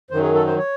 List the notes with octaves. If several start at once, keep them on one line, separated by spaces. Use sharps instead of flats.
F#2 D#3 F#3 C5
G#4
A4
C5
C#5